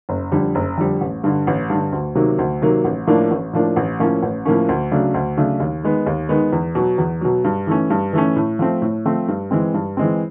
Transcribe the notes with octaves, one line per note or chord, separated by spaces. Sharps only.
F#1
F2 D3 G3
F#1
F2 D3 G3
A1
G2 D3
A1
G2 D3
D2
C3 D#3 F#3 A#3
D2
C3 D#3 F#3 A#3
A1
A2 F3 A#3 D4
A1
A2 F3 A#3 D4
A1
A2 F3 A#3 C#4
A1
A2 F3 A#3 C#4
D2
C#3 F#3 A3 D4
D2
C#3 F#3 A3 D4
D#2
D#3 G#3 B3
D#2
D#3 G#3 B3
E2
B2 F#3
E2
B2 F#3
G2
E3 A3 C#4
G2
E3 A3 C#4
A2
F3 A3 C4
A2
F3 A3 C4
G2
E3 G#3 C4
G2
E3 G#3 C4